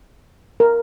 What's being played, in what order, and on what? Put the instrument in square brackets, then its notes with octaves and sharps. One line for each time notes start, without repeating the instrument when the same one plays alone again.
[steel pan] A#4